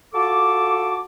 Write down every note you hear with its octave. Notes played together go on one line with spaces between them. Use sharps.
F4 F#4 A4 A5 D6